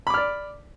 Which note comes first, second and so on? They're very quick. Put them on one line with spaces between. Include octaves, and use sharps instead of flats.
B5 D6 F6 D5